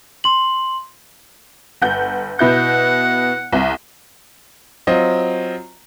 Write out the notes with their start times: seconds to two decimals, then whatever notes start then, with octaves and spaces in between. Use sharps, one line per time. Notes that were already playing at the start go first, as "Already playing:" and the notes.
0.24 C6 F#7
1.82 G1 F#5 G6
2.39 B2 E4 F#5 G6
3.53 C2
4.87 F#3 C4 F4 D#5